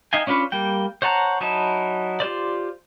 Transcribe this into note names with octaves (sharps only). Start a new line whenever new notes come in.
D#4 E5 F5 G5 G#5
C#4 D4 F4 B4 C#5
G3 A#3 G5
C5 C#5 F#5 A5 A#5
F#3 D#4 E4 A5
F4 G4 C5 D5